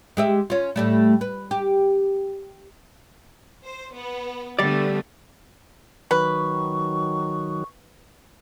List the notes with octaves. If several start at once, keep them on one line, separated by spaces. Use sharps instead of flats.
G#3 G4 E5
C#4 F4
A2 G3 A3
B4
G4
C5
B3
D3 G3 A3 B3 D5
D#3 F#3 B4 C#6